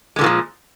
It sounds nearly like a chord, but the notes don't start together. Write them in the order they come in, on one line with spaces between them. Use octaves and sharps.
G#3 D3 A#2 D#3 F3